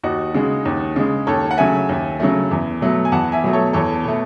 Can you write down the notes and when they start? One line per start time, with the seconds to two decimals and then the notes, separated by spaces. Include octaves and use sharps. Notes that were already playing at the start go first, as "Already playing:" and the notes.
0.03 D#2 D#4 F#4
0.34 C#3 G#3
0.65 D#2
0.96 C#3 G#3
1.27 D#2 A4 C#5
1.51 F#5
1.57 C#3 F#3 A3 E5 G#5
1.89 D#2
2.20 C#3 F#3 A3
2.51 E2
2.81 B2 F#3 A3
3.05 G#5
3.12 E2 F#5 A5
3.32 E5 G#5
3.44 B2 F#3 A3
3.53 A4 C#5
3.73 E2 A4 C#5
4.04 B2 A3